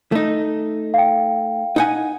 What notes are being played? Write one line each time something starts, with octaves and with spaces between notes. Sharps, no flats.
A3 D#4
F5 G5
D#4 F#5 G#5